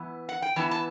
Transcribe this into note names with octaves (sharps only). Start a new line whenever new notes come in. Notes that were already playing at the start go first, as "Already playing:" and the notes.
Already playing: E3 B3 E4
F#5
G5
E3 B3 E4 A5
A5